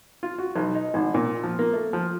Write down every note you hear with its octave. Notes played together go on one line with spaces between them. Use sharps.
F4
F#4
B1
D#4
G#1
A#2
F3
A#3
A3
F3